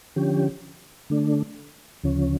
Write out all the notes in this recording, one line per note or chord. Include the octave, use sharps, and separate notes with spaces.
D3 F3 C#4 G4
D3 A3 D4
D2 C#3 F3 C#4